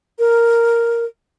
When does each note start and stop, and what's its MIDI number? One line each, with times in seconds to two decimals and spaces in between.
0.19 1.05 70